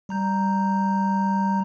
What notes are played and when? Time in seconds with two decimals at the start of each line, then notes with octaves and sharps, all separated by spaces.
0.09 G3 A#5 G6